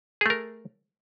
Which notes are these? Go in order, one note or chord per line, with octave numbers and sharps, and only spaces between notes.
A3 G#4 A#4